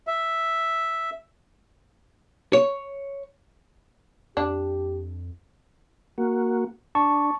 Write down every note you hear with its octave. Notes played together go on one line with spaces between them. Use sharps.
E5
C#5
F2 D4 G4
A#3 F#4
D4 A5 C#6